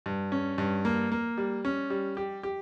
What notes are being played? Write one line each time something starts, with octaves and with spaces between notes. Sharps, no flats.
G2
C#4
G2
A#3
A#3
G3
C#4
G3
G4
G4